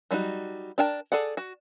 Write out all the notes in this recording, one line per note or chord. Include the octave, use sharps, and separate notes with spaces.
F#3 G3 D#4 F#4
D4 A#4 G5 A5
G#4 A4 D5 F#5
F#4